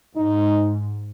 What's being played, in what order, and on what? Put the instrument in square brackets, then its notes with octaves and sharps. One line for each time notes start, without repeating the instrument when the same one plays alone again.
[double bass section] G#2 [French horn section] D#4